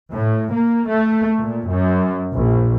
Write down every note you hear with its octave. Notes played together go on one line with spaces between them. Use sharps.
A2
A#3
A3
A#2
F#2
A#1